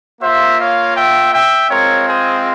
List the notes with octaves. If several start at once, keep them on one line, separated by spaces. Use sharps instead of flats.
A#3 F4 C5 E5
C#5 F5
E5 G5
E5 G5
G#3 C4 F4 A#4 C#5
G#4 C5